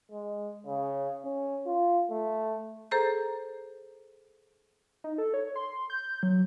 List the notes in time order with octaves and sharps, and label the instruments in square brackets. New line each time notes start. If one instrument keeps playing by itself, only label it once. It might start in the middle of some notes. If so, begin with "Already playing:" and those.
[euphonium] G#3
C#3
C#4
F4
A3
[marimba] G#4 A4 C5 A#5 G6
[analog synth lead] D#4
A4
C#5
C6
G6
F#3